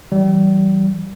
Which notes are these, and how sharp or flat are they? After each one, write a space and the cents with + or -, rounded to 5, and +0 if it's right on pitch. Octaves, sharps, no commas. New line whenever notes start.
E3 +0 G3 -35